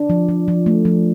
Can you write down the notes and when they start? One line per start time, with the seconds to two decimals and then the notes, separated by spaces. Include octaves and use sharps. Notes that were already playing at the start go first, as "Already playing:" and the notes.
Already playing: D4
0.09 F3
0.29 F3
0.48 F3
0.66 A3
0.85 F3